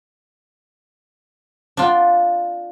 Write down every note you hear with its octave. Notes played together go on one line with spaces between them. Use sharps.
D4 F4